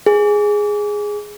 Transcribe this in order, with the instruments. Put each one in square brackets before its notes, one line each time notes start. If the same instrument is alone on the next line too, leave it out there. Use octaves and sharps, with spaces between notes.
[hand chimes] G#4